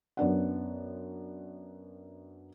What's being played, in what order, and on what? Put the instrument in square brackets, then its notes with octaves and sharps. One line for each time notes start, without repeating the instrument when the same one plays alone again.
[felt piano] F#2 B3 D4 F#5